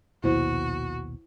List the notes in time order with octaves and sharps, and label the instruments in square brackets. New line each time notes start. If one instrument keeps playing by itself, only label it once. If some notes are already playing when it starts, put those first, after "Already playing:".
[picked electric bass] A#1 D#2 B2 [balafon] E4 C5 [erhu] F#4